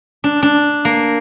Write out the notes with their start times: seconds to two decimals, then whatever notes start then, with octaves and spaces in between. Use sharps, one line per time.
0.24 D4
0.43 D4
0.85 A#3